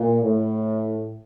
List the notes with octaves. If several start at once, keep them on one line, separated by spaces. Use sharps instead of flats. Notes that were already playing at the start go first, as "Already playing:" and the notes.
Already playing: A#2
A2